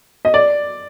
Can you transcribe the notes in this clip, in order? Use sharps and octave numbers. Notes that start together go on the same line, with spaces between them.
D#5
D5